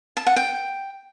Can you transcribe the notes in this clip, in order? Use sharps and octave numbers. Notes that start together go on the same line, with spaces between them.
A5
F#5
G5